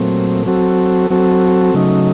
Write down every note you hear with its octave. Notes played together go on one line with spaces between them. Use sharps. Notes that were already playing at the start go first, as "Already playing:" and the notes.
Already playing: A#2 F#3 A3 C4
F#3 C4 F#4 A4
F#3 C4 F#4 A4
C#3 F#3 A3 D#4